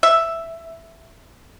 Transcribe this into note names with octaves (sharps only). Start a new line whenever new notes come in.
E5